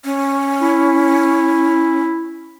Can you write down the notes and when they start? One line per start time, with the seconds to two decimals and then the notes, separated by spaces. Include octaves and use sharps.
0.05 C#4
0.61 E4